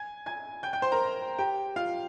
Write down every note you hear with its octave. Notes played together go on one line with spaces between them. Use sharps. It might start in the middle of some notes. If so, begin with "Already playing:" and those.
Already playing: G#5 G#6
G#5 G#6
G5 G6
G5 G6
C5 C6
A#4 A#5
G4 G5
F4 F5